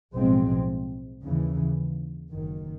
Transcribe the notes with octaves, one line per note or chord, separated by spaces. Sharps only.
B1 A2 F3 G#3 C4
D#2 C#3 E3
F#1 F#2 D#3